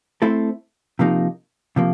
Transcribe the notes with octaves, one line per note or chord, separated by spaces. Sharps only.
A3 C4 E4 A4 C5
C3 F3 A#3 D#4
C3 F3 A#3